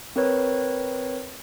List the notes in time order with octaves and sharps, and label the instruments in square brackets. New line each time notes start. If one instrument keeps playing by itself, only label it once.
[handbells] C4 A#4 B4 C#5